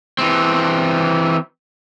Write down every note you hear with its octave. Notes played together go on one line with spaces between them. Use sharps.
E3 C4